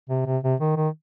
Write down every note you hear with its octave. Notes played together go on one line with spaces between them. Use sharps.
C3
C3
C3
D#3
D#3